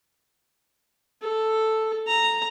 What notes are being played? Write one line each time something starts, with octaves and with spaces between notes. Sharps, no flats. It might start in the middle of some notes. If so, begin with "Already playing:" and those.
A4
A#5